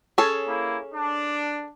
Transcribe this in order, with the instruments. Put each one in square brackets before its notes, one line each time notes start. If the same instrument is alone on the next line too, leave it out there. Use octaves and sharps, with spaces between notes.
[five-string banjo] C#4 G#4 A4
[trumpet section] A#3 E4
D4